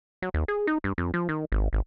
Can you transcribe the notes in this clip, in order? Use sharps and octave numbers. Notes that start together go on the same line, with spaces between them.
F#3
D#2
G#4
D#4
G2
F2
F3
D#3
G#1
G#1